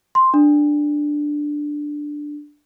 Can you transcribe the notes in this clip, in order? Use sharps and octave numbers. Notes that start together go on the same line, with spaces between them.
C6
D4